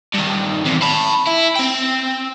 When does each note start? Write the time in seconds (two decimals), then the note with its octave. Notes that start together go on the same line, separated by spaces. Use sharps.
0.14 G2 D#3
0.65 E2 C3
0.82 A5 B5
1.27 E4
1.56 C4 G5